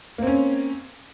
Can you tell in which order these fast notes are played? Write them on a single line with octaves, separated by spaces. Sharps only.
A#3 C4 C#4